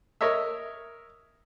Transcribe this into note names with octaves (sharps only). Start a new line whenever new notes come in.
A#4 C#5 D#5 E5 E6